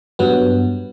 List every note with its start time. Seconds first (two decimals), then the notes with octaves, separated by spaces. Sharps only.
0.19 G2 F#3 B3